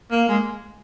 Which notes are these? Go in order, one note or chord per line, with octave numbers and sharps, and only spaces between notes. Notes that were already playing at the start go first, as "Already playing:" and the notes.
A#3
G#3